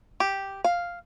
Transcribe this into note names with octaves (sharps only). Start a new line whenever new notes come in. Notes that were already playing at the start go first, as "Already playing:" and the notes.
G4
F5